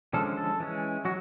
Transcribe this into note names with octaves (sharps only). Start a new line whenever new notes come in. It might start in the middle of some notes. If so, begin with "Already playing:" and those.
D3 F3 G#3 C#4 A4
A4
E3 G#3 C#4
F#3 F#4